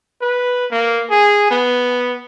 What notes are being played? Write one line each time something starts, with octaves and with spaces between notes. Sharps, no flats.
B4
A#3
G#4
B3